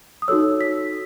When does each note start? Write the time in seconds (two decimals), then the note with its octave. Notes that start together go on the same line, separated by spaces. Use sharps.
0.22 D#6
0.28 D#4 F#4 A4 C#5 E6
0.61 B6